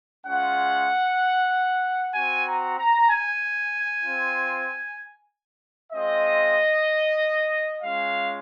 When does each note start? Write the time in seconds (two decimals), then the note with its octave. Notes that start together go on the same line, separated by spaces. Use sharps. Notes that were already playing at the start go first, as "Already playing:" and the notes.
0.25 G#3 C#4 F4 F#5
2.14 C4 F#4 G#5
2.46 A#5
2.79 A#5
3.10 G#5
4.04 C4 F4
5.93 G#3 C4 F4 D#5
7.82 G#3 C#4 F4 F5